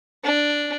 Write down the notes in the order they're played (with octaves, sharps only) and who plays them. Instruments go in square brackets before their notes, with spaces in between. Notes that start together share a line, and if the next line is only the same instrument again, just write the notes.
[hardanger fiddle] D4